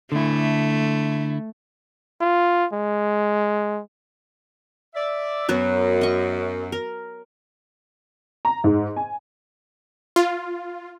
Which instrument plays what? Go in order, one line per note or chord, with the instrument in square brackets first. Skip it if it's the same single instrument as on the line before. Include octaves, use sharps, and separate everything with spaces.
[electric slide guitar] D3 E4 [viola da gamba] A3
[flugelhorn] F4
G#3
[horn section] D5 E5
[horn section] F#2 [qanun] F#3 B3 F#4
[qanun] D#5 C#6
A#4
[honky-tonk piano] A#5
G#2
G#5
[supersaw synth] F4